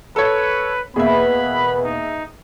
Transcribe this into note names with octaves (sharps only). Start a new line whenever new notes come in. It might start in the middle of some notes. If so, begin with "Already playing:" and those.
A4 B4 C#5
E2 B2 A#3 B3 G#4 B4 E5 B5
D#4